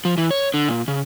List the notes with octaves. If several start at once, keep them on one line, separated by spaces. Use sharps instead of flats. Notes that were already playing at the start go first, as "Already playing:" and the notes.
F3
E3
C#5
D3
A#2
C#3